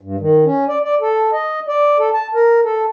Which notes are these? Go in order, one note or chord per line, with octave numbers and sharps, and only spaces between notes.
G2
D#3
C#4
D5
D5
A4
D#5
D5
A4
A5
A#4
A4